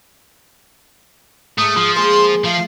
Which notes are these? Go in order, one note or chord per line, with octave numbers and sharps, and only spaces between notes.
G#2 G#3 A3 D#6
F3
G#3 A#3 G#4 C6
F3 A3 F5